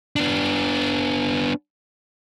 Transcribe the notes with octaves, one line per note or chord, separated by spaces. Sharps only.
B3 D4